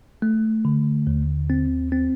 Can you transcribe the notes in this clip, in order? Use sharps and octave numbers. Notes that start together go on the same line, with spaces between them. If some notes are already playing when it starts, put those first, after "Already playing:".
A3
D3
D#2
C4
C4